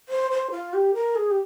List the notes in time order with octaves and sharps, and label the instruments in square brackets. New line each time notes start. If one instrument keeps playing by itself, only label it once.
[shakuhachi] C5
C5
F4
G4
A#4
G#4
G4